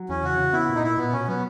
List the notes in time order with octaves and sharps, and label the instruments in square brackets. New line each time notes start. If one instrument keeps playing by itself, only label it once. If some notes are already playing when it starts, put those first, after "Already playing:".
Already playing: [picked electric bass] F#3
[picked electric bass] E2 [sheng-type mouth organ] C#4
[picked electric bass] C#3 [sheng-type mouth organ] F#4
[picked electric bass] C#3
[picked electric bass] B3 [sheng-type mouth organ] E4
[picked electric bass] A#2
[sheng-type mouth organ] D#4
[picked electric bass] A#2 [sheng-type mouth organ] E4
[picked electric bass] A#2 [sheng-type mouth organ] B3
[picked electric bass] B2 [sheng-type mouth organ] C#4
[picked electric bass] F#3 [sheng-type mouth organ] B3